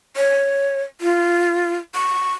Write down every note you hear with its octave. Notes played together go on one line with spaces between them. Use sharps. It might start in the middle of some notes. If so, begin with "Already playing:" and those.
C#5
F4
C#6